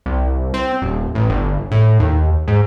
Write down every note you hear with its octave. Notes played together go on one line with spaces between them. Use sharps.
C2
C4
D#1
A1
G1
A2
D#2
G#2